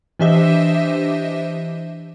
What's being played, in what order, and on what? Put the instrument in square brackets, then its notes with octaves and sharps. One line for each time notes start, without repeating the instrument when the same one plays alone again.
[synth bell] E3 D4 G4 C5 D#5 E5